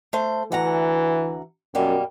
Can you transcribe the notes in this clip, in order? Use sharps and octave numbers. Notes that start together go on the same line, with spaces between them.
A3 C5
D2 E3 F#5 A#5
F#2 B2 G3 A#3